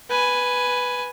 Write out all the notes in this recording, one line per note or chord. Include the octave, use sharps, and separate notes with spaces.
B4 G#5